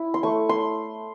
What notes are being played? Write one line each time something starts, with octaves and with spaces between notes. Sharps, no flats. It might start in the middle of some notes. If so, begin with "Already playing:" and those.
Already playing: E4
C6
A3 C#6
C6